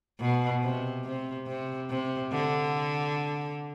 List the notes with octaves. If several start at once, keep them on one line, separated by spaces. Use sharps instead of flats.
B2
C3
C3
C3
C3
D3